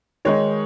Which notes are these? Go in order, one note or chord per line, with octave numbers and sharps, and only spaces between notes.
D#3 G#3 D#4 C#5